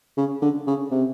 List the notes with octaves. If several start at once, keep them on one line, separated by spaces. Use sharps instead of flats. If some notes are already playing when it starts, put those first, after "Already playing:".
C#3
D3
C#3
C3